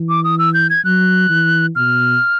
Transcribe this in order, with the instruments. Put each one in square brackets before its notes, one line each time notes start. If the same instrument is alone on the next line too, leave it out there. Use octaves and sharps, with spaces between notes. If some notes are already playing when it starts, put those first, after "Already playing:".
Already playing: [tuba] E3
[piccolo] D6
D#6
E6
G6
G#6
[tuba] F#3 [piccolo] F#6
[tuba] E3
[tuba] B2 [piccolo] F6